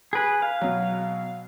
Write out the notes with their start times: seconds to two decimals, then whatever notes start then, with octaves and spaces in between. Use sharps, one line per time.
0.13 G#4 B4
0.42 F5
0.61 B2 F#3